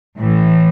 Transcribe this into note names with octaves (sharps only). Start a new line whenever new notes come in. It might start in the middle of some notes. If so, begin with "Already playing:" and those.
A2 E3